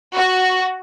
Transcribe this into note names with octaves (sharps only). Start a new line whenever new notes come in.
F#4